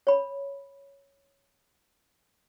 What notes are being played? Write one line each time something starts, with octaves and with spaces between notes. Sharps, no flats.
C#5 B5